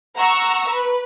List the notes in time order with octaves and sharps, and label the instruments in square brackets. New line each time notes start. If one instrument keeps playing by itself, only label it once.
[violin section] F#5 A#5 C#6 E6
B4